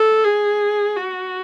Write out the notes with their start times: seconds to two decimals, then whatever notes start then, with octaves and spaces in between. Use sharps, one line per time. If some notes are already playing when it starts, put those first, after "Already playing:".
Already playing: A4
0.24 G#4
0.96 F#4